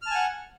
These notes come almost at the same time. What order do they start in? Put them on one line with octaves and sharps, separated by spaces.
F6 A5 G#5 F#5